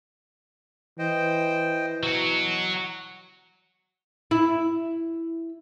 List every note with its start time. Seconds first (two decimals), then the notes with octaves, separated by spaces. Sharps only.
0.99 E3 C5 D#5 G5
2.03 B2 F#3 F#4
4.31 E4